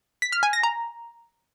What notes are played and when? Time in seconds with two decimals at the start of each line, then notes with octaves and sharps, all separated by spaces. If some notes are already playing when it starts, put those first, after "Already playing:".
0.22 B6
0.32 F6
0.43 G#5
0.53 A#6
0.63 A#5